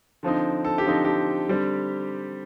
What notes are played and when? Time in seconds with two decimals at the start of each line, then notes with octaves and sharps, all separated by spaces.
0.23 D3 F3 C4 D#4
0.65 A4
0.78 G4
0.85 D3 F3 C4 D#4
1.05 G4
1.49 D3 G3 C4